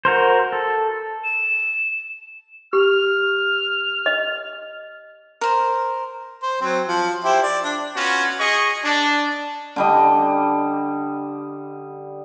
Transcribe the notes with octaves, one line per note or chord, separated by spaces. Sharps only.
F#4 A#4 C5
A4
E7
G4 F6
D#5
A#4 C5
C5
F#3 C4
F3
E4 G4 C5
D5
D4
B3 C#4 F4 F#4
G#4 D#5 C#6
D4
D3 G3 D#5